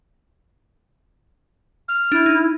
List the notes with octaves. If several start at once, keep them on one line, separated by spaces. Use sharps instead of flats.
F6
D4 E4
D#4